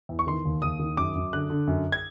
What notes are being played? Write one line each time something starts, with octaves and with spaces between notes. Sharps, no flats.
E2
C#6
D#3 C6
D#2
D#2 D#6
D#3
F#2 D6
F#2
D3 F#6
D3
F#2
G#6